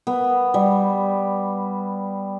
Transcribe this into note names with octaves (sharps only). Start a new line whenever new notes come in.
B3
G3